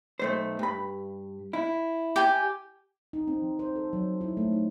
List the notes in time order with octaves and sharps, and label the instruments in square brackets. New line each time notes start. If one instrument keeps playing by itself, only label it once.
[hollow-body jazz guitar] B1 A3 C5
G2 B5
E4
[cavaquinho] G4 G#5
[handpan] D#4
C4
F3
C5
A4
F#3
E4
A3
D#4